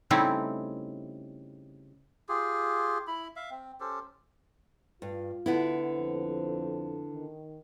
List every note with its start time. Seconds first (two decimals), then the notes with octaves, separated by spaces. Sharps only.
0.11 C#3 G3 A3 C4 D#4 E4
2.29 F4 G4 G#4
3.07 E4 B5
3.36 E5 F5
3.50 C4
3.80 C#4 G4 A4 C5
5.02 G2 F4
5.46 D3 B3 E4
5.96 F2 C5
7.12 D#3